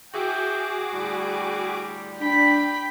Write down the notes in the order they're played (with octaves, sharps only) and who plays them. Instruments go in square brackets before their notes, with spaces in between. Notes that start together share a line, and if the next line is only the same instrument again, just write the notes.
[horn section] E3 E5 G5 [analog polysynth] F#4 G#4 D6
[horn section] A2 D3 G3
[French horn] D4 [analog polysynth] G5 [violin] B5 B6